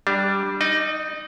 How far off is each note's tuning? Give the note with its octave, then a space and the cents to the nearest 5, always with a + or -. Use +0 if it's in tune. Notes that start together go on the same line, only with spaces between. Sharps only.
G3 +0 D4 +0
D#4 +0 D#5 -45